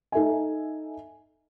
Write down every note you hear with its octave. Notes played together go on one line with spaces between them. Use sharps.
D#4 A4 E5 G#5